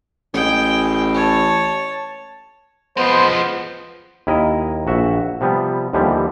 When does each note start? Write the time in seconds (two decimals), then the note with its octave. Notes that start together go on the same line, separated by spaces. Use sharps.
0.34 A1 G#3 G5
1.14 C#5 A5
2.97 F3 G#3 B3 C5
4.27 D#2 E4 A#4 D#5
4.87 A#1 F#4 E5
5.41 C3 F3 G3 B3
5.93 D#2 D3 E3 F3 G3